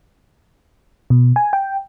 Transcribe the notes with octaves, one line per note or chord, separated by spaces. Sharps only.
B2
G#5
G5